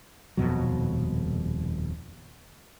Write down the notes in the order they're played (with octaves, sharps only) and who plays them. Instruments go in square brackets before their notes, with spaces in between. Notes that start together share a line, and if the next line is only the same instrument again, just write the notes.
[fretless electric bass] D#1 F2 B2 F#3